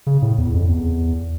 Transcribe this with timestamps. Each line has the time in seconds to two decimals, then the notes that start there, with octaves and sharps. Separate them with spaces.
0.07 C#3
0.22 A2
0.38 E2
0.54 F2
0.69 E2